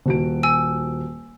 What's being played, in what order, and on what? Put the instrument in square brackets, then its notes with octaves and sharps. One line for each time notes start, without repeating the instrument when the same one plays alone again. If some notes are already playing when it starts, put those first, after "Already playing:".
[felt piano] D#1 F#4 D7
[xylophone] G#5 E6